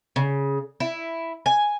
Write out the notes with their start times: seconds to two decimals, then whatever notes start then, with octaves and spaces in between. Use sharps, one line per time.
0.16 C#3
0.80 E4
1.46 G#5